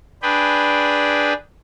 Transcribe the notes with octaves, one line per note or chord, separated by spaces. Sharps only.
D4 G#4 B4 G5